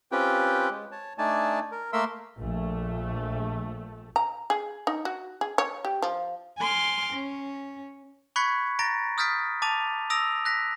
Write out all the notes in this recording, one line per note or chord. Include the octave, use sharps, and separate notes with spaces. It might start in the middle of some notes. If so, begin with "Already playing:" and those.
C4 C#4 F4 G4 B4 G5
G#3
C#5 A5
A3 D4 D#4 D5 G#5 A5
A#4
A3 A#3 A#4 E5 C6 E6
A#1 A3
A#5
G#4
D#4
F#4
G#4
C#5
G4
F3
G#5 C6 D6 F6
C#4
B5 C#6 F#6 G#6 B6 C#7
A#5 A6 A#6 D7
D#6 F6 G6 A6 B6 D7
A5 D6 A6 D#7 F7
D#6 E6 A#6 D7 F7
F#6 A#6 B6